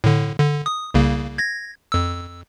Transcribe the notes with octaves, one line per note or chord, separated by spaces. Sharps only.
A2 D3
D3
D#6
C2 C#3 A#3
G#6 A#6
F2 E6